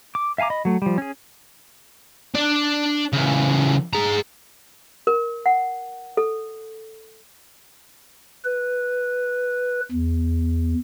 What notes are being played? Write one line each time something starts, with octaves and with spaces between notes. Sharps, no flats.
D6
E5 F5 G#5 A#5 D6
D#5 B5
F#3 A3
F3 G3
C#4 G#4
D4 D5
C#3 E3
G#4 A#5
A#4
F#5
A4
B4
E2